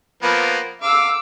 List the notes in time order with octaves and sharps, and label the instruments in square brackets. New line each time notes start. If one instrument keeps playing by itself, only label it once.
[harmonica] F3 A#3 B3
[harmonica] F5 [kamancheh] D6 E6